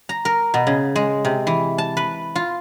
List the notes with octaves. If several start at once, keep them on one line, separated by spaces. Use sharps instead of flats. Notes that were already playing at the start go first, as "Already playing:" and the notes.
A#5
A#4
B2
C#3
G#3
C3
E3
A5
B4
F4